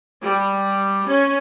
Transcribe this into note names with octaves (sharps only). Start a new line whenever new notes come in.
G3
C#4